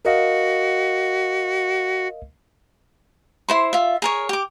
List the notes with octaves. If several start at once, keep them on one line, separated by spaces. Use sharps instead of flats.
F#4 A#4 D#5 F5
E4 C5 C6
F4 E5
G#4 A#4 C#5
G4 D6